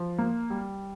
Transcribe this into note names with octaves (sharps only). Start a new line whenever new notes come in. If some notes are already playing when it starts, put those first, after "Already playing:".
Already playing: F3
A#3
G3